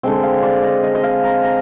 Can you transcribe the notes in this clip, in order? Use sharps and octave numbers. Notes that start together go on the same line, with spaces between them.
D3 G#3 C4 G5
F5
D5
D#5
D#5
D#5
F5
A#5
A#5